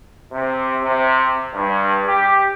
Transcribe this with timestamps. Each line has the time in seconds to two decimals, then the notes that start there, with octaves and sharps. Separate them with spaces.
0.32 C3
0.84 C3
1.54 G2
2.07 G4